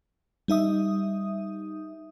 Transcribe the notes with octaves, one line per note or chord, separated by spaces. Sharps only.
G3 D#4 E5 D#6